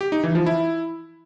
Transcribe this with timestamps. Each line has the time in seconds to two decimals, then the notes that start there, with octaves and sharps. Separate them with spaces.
0.01 G4
0.12 D#4
0.24 E3
0.35 F3
0.46 E4